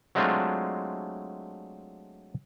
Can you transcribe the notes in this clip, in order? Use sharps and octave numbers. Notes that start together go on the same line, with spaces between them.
F#3 G#3 A3 C4 D4 F4